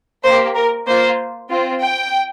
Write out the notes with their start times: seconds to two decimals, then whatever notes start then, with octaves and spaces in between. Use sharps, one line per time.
0.24 A#3 G4 C5
0.56 A#4
0.87 A#3 F4 C5
1.50 C4 F4
1.82 G5